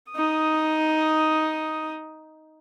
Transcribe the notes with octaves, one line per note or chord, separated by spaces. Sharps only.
D#4 D#6